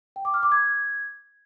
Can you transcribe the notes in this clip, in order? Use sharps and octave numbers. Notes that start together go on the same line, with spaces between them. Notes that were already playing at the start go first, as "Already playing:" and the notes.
G5
D6
F6
D6
G#6